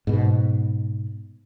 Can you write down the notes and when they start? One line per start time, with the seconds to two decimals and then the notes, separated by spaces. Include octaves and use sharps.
0.07 G#2 B2